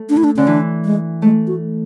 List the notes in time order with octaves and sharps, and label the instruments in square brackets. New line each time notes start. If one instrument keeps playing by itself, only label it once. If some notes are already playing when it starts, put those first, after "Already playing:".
Already playing: [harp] A3
[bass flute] D4
E4
D4
[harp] D3 [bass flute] C#4
[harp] E3 [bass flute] D4
[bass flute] G#3
[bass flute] G#3 [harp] A3
[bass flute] F#4